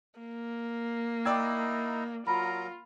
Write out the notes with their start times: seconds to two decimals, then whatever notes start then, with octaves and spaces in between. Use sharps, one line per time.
0.20 A#3
1.25 D#4 E4 D5 G5 D6 E6 G#6
2.27 F#3 F4 A#4 A#5 B5